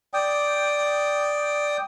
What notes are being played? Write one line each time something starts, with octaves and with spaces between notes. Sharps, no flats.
D5 G5 D#6